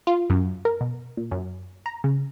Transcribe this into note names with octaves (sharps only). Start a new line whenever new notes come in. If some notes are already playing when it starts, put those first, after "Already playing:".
F4
F#2
A#4
B2
A#2
F#2
A#5
C#3